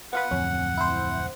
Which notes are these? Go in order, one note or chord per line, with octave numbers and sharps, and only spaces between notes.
B3 F4 B4 F#5
D1 F2 F3 C#4
E4 C5